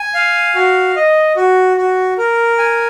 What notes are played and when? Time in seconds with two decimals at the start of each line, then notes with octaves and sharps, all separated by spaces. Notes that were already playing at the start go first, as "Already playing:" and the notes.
Already playing: G#5
0.14 F5
0.55 F#4
0.96 D#5
1.36 F#4
1.77 F#4
2.18 A#4
2.58 G#5